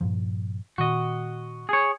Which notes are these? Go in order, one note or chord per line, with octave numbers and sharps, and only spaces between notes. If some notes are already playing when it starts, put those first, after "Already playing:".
G2 A#2 F3
A#2 D#3 F#4 D#5
G#4 C#5